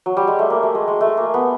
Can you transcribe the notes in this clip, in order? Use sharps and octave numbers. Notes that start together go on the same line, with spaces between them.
F#3
G3
G#3
A3
A#3
A3
G#3
G#3
A3
A#3
B3